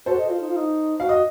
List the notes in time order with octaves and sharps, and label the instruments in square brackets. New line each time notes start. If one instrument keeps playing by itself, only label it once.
[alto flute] F#4 [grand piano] A4 C5
[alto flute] D#5
F4
D#4
F4
D#4
[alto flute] F#4 [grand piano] F5
[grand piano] D#5